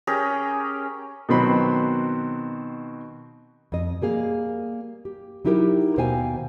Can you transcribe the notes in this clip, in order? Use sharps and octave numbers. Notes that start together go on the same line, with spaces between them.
C#4 G4 G#4 A#4
B2 D#3 F#3 C4 B5 C6
F2 D#5
G3 A#3 G#4 F5
G4
F#3 D#4 E4 G4 A#4
D#2 B2 C5 F5 G5 G#5